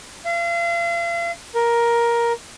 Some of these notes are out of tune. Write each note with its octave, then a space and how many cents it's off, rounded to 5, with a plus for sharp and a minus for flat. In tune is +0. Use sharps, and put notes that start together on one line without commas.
F5 -40
A#4 +10